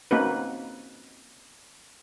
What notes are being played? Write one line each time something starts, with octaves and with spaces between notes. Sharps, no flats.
A#3 C4 C#4 D#4 F#4 B4